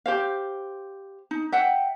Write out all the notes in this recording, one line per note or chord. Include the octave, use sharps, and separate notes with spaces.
G4 C5 F5
D#4
E5 F#5 G5